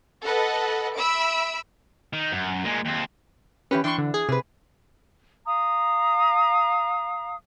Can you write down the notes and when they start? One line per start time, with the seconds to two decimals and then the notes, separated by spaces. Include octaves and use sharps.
0.24 A4 B4 D#5 F#5
0.95 E5 B5 E6 D7
2.13 D#3
2.32 F#2
2.64 A#2 G#3
2.85 D#2 C4
3.71 E3 C#4 G4 B4
3.84 E3 D4 G5 C6 C#6
3.98 D3
4.14 G#4
4.29 C3 G#4 B4
5.47 F5 A#5 D#6